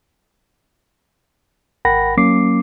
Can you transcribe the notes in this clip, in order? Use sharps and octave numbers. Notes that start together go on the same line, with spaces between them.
G#1 A#4 F#5 G5 B5 A#6
F#3 A#3 C#4 D6 C7